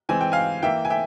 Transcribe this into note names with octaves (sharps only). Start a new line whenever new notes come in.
E3 G#3 C4 G#5
G5
F5 G#5
E3 A#3 E5 G5
G#5
E5 G5